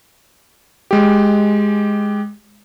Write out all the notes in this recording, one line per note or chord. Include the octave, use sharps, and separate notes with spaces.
G#3 G4